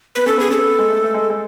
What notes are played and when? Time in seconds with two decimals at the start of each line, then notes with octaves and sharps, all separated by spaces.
0.15 B3 B4
0.26 C#4 A4
0.37 B3 G#4
0.48 C#4 A4
0.58 B3
0.79 G#3
0.89 A3
1.03 A3
1.14 G#3
1.30 G#3